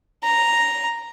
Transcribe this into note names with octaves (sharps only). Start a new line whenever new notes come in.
A#5